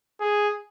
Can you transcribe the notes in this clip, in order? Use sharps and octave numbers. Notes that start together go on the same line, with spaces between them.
G#4